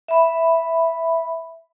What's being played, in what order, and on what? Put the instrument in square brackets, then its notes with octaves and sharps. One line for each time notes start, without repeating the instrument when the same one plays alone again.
[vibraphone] E5 B5